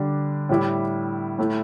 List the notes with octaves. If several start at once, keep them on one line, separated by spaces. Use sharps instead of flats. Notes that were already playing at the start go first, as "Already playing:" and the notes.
Already playing: D3 G3 D4
A2 G3 E4
A2 A3 E4